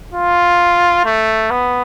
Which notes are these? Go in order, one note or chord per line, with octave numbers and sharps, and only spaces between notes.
F4
A3
B3